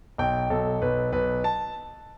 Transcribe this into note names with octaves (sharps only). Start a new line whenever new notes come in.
B1 G5
B1 A4
B1 B4
B1 B4
A5